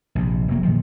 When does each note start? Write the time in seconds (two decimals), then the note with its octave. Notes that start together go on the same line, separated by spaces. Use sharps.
0.15 A#1 C3
0.48 F1 C3 F#3 A#3
0.63 A#2 D#3 F3